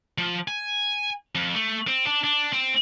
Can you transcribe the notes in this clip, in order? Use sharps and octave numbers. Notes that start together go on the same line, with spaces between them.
F3
G#5
F2
A3
C4
D4
D4
C4